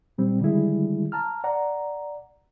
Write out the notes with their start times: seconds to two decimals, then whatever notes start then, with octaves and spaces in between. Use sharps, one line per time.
0.18 A#2 G3 C4
0.41 D3 D#3 G3 G#3 E4 G#4
1.12 A5 A#5 F6
1.44 D5 F#5 A#5